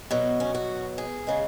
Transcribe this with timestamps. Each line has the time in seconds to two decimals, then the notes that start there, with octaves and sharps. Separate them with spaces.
0.11 B2 F#3
0.40 C#4
0.55 F#4
0.98 G#4
1.27 C#3 G#3